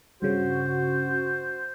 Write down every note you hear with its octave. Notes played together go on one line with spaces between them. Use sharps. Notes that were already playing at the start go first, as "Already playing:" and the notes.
G2 C#3 F#4 C5